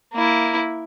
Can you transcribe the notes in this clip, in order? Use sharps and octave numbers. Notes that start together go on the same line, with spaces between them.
A#3 E4